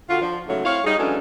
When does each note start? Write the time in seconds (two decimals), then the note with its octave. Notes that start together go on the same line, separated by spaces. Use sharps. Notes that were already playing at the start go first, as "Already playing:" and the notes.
0.09 D3 F4 F#4
0.21 F3 D4
0.47 G#2 C#3 F#3 A3
0.65 C4 E4 C#5 F5
0.84 G3 D#4 G#4
0.97 E3 F#3 G#3 C#4 D4 A4